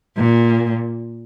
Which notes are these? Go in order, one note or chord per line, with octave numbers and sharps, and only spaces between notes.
A#2